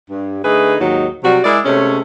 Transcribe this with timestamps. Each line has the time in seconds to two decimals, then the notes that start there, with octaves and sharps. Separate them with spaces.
0.10 G2
0.44 D3 A3 D#4 G#4 B4
0.80 D#2 G#2 F#3 D#4
1.24 C3 F#3 G3 F#4
1.44 G#3 E4 G#4 A#4 D5
1.65 C3 G#3 A3 C#4